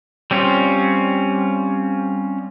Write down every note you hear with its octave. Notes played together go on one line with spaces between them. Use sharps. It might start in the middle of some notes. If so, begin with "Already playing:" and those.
G3 C4 C#4 F4